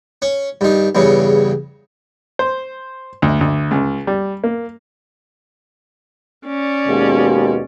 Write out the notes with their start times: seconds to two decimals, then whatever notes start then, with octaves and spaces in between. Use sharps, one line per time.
0.22 C#4
0.61 G2 D#3
0.95 E2 G2 C#3
2.39 C5
3.22 D2
3.41 D2
3.71 C#2
4.07 G3
4.44 A#3
6.46 C#4 D5
6.87 D#2 B2 G#3